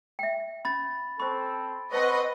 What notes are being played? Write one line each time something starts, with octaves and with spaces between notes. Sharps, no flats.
E5 G5
C#4 B5 A6
C4 A4 C5 B5 C#6
C4 B4 C5 D#5 F#5 A5 C#6